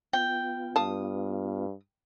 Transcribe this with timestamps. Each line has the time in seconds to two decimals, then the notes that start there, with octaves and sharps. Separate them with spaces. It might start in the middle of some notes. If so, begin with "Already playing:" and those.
0.13 B3 F4 G5
0.76 G2 F5 A5 D#6